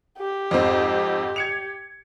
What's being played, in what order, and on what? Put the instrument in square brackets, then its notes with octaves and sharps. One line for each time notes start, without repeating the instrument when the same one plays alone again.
[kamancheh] G4
[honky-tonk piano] F2 G#2 C4
G#6 C#7 F7